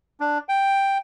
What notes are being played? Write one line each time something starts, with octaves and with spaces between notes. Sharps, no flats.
D4
G5